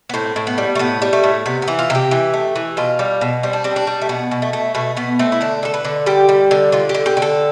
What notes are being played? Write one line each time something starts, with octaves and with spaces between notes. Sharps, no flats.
B3
A2 C4
A2
B3
G3
A3
A2 B3
G3
A3
A2
C3 B3
B3
E3
F4
C3 G4
E3
A3
E3
B2 F4
G3
B2
G3 C4
D4
G3 C4
D4
G3
A3
B2 B3
B2
A3
A3
B2 A3
B2 B3
A3 C4
E4
D3 D4
D3 A4
B4
D3
G3 G4
G3
D3
D3 F4
G4
D3
G4
D3
A4